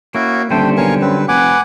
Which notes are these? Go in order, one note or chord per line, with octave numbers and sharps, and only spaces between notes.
A#3 C#4 E4 F#4
D#1 D3 G3 A3 C5 G5
B1 A#4 C#5 F5 G#5 C#6
F#2 C4 B4
F1 B4 F#5 G#5 D6